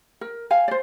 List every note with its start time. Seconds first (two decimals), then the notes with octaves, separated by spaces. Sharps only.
0.21 A#4
0.51 F5 G#5
0.68 C5 D5